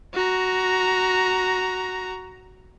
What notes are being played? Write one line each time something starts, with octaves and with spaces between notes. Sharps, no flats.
F#4 A#5